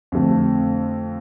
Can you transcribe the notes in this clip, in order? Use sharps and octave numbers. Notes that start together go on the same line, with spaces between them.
F2 D3 A3